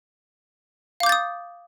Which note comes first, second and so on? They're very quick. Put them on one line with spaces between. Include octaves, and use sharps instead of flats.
F5 D6 G6 A6 D#6